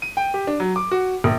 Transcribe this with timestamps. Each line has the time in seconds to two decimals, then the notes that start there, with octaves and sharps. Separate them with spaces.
0.02 D#7
0.17 G5
0.34 G4
0.47 D4
0.60 F#3
0.76 D6
0.91 F#4
1.24 A#1